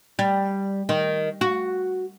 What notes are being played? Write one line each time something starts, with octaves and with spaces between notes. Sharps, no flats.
G3
D#3
F#4